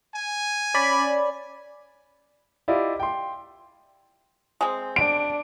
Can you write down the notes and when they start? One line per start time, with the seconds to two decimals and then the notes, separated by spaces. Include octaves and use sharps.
0.15 G#5
0.74 C#4 D5 B5
2.68 E4 F4 G4 D5 D#5 F5
3.00 G5 C6
4.61 G#3 C4
4.96 D4 D7